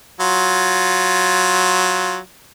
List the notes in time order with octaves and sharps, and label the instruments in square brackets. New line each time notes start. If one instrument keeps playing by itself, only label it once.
[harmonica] F#3 F4